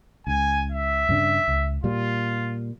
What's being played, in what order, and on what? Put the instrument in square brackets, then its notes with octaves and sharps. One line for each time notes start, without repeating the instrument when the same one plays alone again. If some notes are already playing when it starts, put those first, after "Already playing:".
[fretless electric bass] C#2 [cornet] G#5
[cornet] E5
[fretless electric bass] G2 C#3 D4
C#2
[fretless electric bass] A#2 G3 [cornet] F4